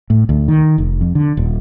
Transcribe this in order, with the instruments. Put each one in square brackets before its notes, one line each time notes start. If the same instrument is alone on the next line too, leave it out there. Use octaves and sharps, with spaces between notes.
[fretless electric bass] A2
D2
D#3
F1
F2
D3
D#1